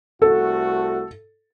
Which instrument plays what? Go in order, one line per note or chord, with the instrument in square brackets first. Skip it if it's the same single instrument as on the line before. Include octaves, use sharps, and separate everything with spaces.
[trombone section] C2 A3 F#4 [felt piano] A4